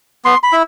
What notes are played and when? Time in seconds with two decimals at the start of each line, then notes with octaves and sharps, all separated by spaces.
0.25 B3 C6
0.43 B5
0.53 E4